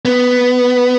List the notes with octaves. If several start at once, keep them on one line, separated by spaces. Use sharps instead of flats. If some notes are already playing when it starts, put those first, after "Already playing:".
B3